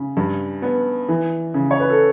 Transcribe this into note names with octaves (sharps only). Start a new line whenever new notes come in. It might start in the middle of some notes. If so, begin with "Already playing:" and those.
Already playing: C#3
G2
B3
E3
C#3
C#5
B4
A4